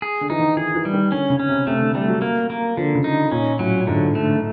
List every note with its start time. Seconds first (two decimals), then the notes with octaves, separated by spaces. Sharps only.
0.02 G#4
0.21 D3
0.30 E3 D#4
0.39 D#3
0.57 E3 G#4
0.75 E3
0.85 G3
0.93 D#3
1.12 D3 C#4
1.30 C#3
1.40 C#4
1.49 C3
1.67 C3 A3
1.81 D3
1.95 G3 A3
2.08 F#3
2.22 A#3
2.50 A#3
2.77 D3 F3
2.95 C#3
3.04 D#4
3.32 A#2 C#4
3.59 A2 F#3
3.87 G#2 D3
4.15 A3